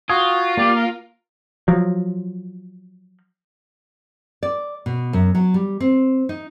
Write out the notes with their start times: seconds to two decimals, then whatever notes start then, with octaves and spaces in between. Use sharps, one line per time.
0.10 F4 F#4 G#5 D#6
0.57 A#3 G4 D5
0.76 A#4
1.68 F3 F#3
4.43 D5
4.86 B2
5.13 F#2
5.35 F#3
5.54 G3
5.80 C4
6.29 D#4